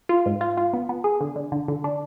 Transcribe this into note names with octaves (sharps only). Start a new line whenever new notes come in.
F4
G#2
F4
F4
B3
B3
G#4
D3
D3
D3
D3
D4